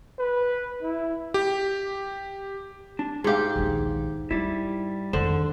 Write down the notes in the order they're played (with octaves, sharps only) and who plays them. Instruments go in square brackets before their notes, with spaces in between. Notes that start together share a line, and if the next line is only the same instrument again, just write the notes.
[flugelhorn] B4
E4
[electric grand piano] G4
[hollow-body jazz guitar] D4
[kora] G#2 G4 [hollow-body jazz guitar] G#4 F5
[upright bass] A#1 D#2
[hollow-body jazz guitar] G3 E4 [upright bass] F4
[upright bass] F2 D#3 [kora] D3 [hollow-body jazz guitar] C5